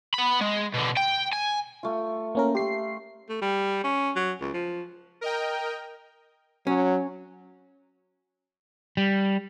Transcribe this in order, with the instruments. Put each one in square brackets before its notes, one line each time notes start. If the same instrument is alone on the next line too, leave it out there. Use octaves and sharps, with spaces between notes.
[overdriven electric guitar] B3 B5
G#3
B2 D3
G5
G#5
[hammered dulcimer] A3 F4
[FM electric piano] A#3 C#4 A#4
[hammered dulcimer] A3 C6 [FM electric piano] G4 C7
[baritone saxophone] A3
G3
C#4
F#3
C#2
F3
[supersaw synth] A#4 D#5 G5
[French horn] F#3 [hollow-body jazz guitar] C#4
[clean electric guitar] G3